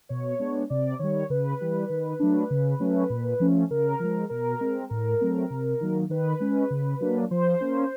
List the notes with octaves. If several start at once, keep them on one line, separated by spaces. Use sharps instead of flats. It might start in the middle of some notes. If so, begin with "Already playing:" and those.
B2 C#5
G#3 B3 D4
C3 D5
D#3 G3 C#5
C#3 B4
E3 G3
D#3
F#3 A3 D4
C#3
F#3 A3 C#4
A#2
F3 A3 C#4
C#3 A#4
F3 G#3
B2 A#4
G#3 C4
A2 A#4
F#3 A3 C4
C3
D#3 F#3 A#3
D#3 B4
G#3 C#4
C#3
F#3 A#3 D4
F3 C5
A#3 C#4